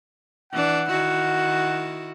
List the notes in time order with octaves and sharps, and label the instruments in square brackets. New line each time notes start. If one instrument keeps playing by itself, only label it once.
[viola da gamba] E3 D4 [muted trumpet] F#5
[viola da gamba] D#3 E4 F#4